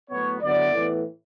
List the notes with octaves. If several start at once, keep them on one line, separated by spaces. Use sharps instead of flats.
A2 F#3 B3 C#5
D3 F#3 B3 E4 D5
A2 E3 B3